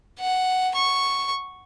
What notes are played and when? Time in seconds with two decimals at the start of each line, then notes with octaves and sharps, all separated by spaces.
0.20 F#5
0.74 C#6